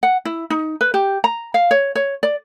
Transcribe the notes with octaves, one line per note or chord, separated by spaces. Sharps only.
F#5
E4
D#4
B4
G4
A#5
F5
C#5
C#5
D5